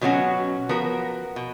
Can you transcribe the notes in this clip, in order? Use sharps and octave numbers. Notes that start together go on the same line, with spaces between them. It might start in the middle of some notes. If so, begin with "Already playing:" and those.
B2 F#3 A#3 C#4 F#4
F3 B3 F#4 A#4
B2